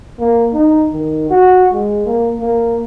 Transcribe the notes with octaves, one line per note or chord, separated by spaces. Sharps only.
A#3
D#4
D#3
F#4
G#3
A#3
A#3